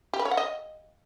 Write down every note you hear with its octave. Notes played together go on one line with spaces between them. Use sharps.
G4
B4
C#5
F#5
D#5